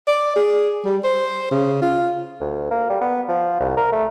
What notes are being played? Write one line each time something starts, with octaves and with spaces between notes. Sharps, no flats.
D5
G#4
G3
C5
C#3
F4
D2
A#3
G3
B3
F3
C2
A#4
A3